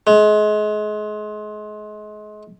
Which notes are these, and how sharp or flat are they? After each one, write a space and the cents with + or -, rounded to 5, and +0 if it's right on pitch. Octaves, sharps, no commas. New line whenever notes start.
G#3 +30